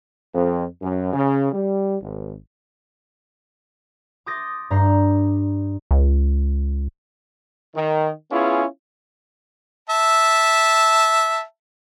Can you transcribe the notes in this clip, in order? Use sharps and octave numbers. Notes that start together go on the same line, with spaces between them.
F2
F#2
C#3
G3
G#1
C6 D6 D#6 G6 A6 A#6
G2 A#5 G6 C7
C#2
D#3
B3 C#4 E4 F4 G#4
E5 A5